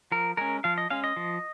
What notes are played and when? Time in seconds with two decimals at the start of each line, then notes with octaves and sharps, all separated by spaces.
0.12 F3 A#4
0.37 G#3 C#4 A#4
0.64 F3 F5
0.78 D#5
0.90 G#3 C#4 F5
1.04 D#5
1.16 F3